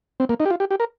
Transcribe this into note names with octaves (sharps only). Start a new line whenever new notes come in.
C4
A#3
D#4
G4
F4
G4
G4
A#4